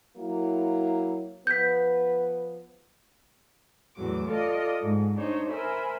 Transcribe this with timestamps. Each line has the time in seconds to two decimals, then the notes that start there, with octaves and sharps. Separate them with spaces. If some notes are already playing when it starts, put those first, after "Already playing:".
0.17 F#3 A#3 E4
1.47 F3 B3 B4 G6 B6
3.95 E2 A2 F#3 D6
4.29 F4 A4 D5 D#5
4.80 G#2
5.14 D4 D#4 C5 C#5
5.48 A#4 C5 E5 G#5 B5